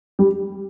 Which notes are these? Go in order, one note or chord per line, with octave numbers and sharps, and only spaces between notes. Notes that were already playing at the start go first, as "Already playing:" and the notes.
G3